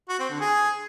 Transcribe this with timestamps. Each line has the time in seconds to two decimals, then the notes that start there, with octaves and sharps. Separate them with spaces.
0.09 F#4
0.19 C4
0.30 D3
0.40 G#4